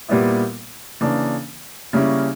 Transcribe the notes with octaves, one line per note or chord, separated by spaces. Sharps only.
A#2 G3 B3 E4
C#3 E3 A#3 D4
C#3 G3 A#3 C#4 E4